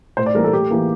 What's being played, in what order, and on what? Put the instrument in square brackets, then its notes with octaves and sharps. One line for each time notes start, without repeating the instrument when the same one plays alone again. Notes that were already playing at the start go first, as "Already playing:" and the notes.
[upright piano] A2 C5
D5
E3 G3 A#3 A#4
A4
A2 G4
E3 A#3